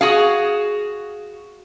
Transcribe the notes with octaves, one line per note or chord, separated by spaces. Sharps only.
F#4 G#4 F5